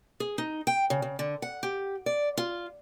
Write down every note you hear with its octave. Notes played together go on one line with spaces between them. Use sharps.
G#4
D#4
G5
C#3
C#3
D3
F#5
G4
D5
F4